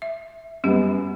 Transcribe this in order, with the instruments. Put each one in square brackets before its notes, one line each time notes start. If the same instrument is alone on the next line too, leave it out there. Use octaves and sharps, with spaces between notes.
[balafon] E5
[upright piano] F#2 B3 [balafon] G3 G4